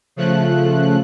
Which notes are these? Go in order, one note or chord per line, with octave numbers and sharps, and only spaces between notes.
C#3 F3 A3 F#6